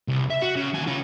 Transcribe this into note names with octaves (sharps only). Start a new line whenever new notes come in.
C2
E5
F#4
C#3
D#2 G#5
C#3 F4